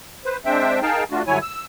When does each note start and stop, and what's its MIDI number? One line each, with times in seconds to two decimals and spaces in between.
0.25 0.37 71
0.25 0.37 72
0.45 0.80 56
0.45 0.80 60
0.45 0.80 62
0.45 0.80 72
0.45 0.80 76
0.45 0.80 79
0.82 1.04 63
0.82 1.04 68
0.82 1.04 70
0.82 1.04 77
0.82 1.04 79
0.82 1.04 81
1.11 1.23 57
1.11 1.23 62
1.11 1.23 65
1.11 1.23 66
1.27 1.39 43
1.27 1.39 50
1.27 1.39 54
1.27 1.39 64
1.27 1.39 73
1.27 1.39 80
1.42 1.65 88